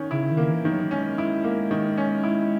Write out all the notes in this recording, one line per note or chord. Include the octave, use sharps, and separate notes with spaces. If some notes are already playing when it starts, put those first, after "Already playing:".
Already playing: D#3 C#4
C#3 E4
D#3
A#3
D#3
E3
D#3
F#3
G#3 C#4
E4
A#3
D#3
C#4
E4